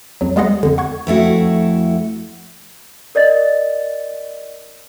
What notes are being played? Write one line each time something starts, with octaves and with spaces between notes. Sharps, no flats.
F2 F#3
G3 G#3 B3 G#4 D#5 F#5
F2 D3
F#5 C#6 G#6
F2 A3 E4 F#4
A#4 D5 D#5 A6